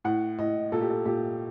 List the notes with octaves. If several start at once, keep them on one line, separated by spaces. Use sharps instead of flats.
A2 F#5
A2 D#5
A#2 A4
G4
A4
A#2 G4